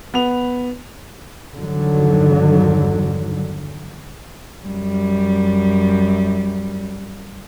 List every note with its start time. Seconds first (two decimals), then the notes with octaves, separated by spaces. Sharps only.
0.14 B3 F7
1.55 E2 G2 D3 D#3 F#3
4.66 F#2 G3